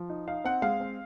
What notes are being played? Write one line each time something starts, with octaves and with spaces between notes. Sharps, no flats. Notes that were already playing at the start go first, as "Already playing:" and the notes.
Already playing: F3
D#4
D#4 F5
C4 F#5
G#3 F5
C4